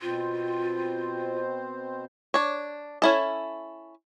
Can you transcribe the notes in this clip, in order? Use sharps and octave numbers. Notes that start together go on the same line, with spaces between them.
B2 C4 F4 C5
D4 C#5
C#4 E4 A4